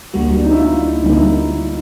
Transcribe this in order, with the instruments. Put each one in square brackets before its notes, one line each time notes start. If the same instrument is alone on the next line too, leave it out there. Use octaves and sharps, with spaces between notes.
[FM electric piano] D2 D3 G3 A#3 [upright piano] F#4
[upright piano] D4
D#4
E4
F4
[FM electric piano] D2 D3 G3 A#3 [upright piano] D#4
[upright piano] E4
D#4